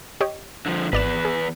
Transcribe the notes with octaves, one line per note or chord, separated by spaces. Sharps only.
G4 C#5 D#5
D3 F3
G#1 E2 B4 D5 E7
G#4